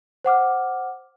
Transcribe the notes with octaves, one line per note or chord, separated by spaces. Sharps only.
C5 F#5 D6 F6